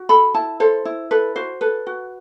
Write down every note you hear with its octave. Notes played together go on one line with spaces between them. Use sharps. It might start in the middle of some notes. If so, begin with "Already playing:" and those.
Already playing: F#4
A4 B5
E4 A5
A4 C5
E4
A4 B4
F#4 C5
A4 B4
F#4